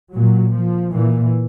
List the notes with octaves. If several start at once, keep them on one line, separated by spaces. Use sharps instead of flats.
A#2 F#3
F3
A#2 E3